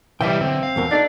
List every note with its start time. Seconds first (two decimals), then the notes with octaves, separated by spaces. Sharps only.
0.21 B1 C3 E3 G3 D#5 E5 G5
0.41 D3 C4
0.63 F5
0.76 E2 B2 A#4
0.91 D4 D#4 A4